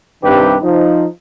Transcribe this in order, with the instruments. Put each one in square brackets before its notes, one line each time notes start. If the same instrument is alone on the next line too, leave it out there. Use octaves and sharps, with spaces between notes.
[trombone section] C2 G2 C3 D#3 G4 B4
F3 D#4